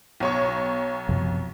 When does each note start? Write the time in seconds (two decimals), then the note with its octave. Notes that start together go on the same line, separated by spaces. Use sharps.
0.20 B1 C#5 C#6
1.09 F#2 C3 F3